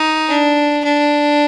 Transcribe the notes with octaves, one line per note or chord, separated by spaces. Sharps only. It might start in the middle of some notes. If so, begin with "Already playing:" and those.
Already playing: D#4
D4
D4